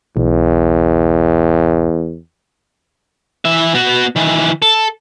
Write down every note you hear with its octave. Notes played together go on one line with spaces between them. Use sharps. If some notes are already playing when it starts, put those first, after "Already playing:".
B1 E2
E3 E5
B3 F#4
D#3 E3
A4